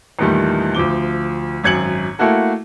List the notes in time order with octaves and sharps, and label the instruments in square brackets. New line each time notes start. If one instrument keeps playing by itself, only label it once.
[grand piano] E2 A#2 D#3 G3 A3
D2 F3 D6 G7
G#1 F#2 G#6 C#7 F#7
A3 A#3 E4 F#4 A4